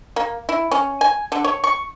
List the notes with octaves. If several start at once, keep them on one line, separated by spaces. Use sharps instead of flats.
A#3
E4
C#4
G#5
D3
C#5
C#6